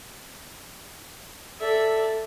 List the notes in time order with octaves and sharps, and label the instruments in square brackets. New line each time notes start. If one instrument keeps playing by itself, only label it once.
[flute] A4 [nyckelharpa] D5 E5